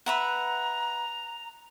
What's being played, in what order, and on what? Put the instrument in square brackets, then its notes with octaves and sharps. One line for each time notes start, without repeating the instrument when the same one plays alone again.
[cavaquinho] B4 E5 F#5 [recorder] A#5